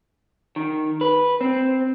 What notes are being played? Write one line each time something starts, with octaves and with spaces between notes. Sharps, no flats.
D#3
B4
C4